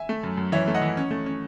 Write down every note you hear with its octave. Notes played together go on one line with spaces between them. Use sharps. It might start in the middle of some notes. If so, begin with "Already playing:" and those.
Already playing: E5 G#5
A3
F#2
F#2
E3 C#5 E5
A3
D#5 F#5
E3
C#4
A3
C#4